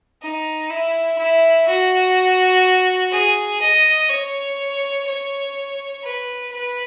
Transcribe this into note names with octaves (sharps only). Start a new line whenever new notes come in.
D#4
E4
E4
F#4
G#4
D#5
C#5
C#5
B4
B4